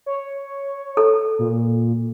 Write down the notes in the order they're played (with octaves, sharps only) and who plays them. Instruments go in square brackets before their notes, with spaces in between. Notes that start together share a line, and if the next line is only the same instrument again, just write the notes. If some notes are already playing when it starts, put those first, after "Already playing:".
[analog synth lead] C#5
[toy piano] A4
[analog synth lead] A#2